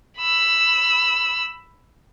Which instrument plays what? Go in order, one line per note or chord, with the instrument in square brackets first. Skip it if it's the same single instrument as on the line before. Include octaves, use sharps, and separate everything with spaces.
[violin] B5 E6